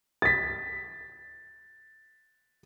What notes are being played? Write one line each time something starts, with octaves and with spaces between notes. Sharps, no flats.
A6 B6